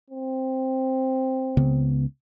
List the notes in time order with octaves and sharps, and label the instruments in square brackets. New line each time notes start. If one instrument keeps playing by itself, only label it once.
[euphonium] C4
[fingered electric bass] C#2 C#3 B3